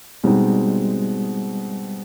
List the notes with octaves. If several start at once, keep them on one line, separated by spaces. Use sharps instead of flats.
B2 G3 G#3 C4 D#4